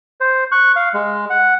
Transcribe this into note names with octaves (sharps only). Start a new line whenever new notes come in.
C5
C#6 F#6
F5
G#3
F#5